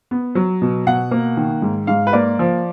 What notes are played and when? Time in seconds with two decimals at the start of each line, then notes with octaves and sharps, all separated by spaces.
0.11 B3
0.35 F#3
0.62 B2
0.87 B2 F#5
1.11 A#3
1.37 D#3
1.62 G#2
1.87 G#2 F5
2.07 B4
2.13 A#3 D5
2.39 F3